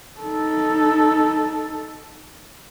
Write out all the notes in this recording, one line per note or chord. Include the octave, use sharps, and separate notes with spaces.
D#4 A4